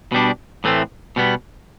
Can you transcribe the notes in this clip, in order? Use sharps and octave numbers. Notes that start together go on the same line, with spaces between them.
B2 G3 D4
A2 E3 A3 C4
B2 G3 B3